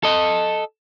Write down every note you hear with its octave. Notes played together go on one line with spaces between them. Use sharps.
A4 D#5